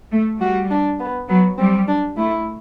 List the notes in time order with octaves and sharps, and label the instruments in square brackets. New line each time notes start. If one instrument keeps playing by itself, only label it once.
[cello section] A3
[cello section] G3 [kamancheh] F#4
[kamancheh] D4
B3
[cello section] F#3 [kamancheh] B3
[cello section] G3 [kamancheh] C4
[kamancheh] D4
[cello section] A3 [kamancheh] E4